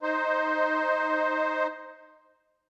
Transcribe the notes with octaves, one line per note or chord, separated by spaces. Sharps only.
D#4 C5